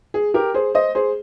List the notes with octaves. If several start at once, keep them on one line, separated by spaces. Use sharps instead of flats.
G#4
G4 A#4
G#4 C5
C5 D#5
G#4 C5